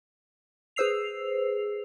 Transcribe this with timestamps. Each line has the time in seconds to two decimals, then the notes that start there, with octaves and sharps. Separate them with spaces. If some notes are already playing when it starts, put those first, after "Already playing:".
0.76 G#4 B4 C5 E6 C7 F7